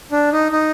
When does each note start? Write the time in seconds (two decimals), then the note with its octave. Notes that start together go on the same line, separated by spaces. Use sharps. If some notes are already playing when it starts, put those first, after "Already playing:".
0.12 D4
0.32 D#4
0.52 D#4